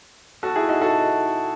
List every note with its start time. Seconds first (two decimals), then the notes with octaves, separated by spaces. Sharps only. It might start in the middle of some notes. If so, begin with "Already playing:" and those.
0.43 F#4 A4
0.56 E4 G#4
0.68 D#4 F#4
0.81 F#4 A4